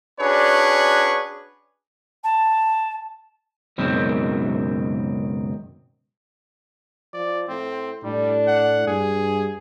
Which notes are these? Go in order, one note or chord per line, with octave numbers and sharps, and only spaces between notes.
C#4 D4 F#4 G#4 B4 C#5
A5
C#2 F#2 B2 D#3 C4
F3 D5
A2 C4
A2 G3 D4
F#5
G2 G#4